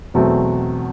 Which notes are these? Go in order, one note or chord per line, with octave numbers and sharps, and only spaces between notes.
E2 B2 F#3 A3 C4